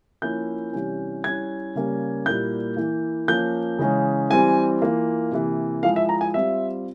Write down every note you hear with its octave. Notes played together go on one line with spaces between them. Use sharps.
F3 A#3 C#4 E4 G6
C3 E3 G3 C#4
G3 C#4 E4 G#6
C#3 G3 A#3 C#4
A#2 G3 A#3 E4 G6
E3 A#3 E4
F3 A#3 C#4 G6
C#3 E3 G#3 C#4
E3 G3 C4 G#5
E3 A#3 F4
C3 E3 A#3
F3 G#3 E4 F5
E5
A#5
G#5
G3 C4 F4 E5